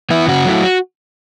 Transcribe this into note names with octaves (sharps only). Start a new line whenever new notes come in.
E3 B3 E4
C#3 F#4
F#3 A3 E4